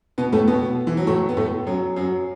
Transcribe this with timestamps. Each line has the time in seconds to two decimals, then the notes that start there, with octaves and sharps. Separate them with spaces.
0.18 B2 B3
0.32 A2 A3
0.47 B2 B3
0.87 E3
0.97 F#3
1.07 A2 A3
1.29 B3
1.37 A2 A3
1.66 F#2 F#3
1.96 F#2 F#3